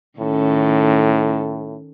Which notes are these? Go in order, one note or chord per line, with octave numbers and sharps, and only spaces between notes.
A2 D#3 C#4 A4